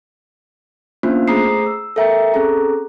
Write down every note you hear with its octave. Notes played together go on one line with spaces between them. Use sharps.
A#3 B3 C#4 D4 F4 C5
A3 G#4 C5 A#5 D#6 C7
E6
A4 A#4 E5 G5 A#5
C4 C#4 G#4 A4 A#5